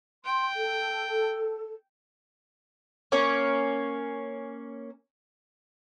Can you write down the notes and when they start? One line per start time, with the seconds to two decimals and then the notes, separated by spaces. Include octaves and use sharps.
0.25 G5 C6
0.56 A4
3.12 A#3 C#4